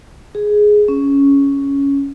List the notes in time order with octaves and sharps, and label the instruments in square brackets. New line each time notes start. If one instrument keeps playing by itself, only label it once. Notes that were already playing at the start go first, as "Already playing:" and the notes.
[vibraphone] G#4
C#4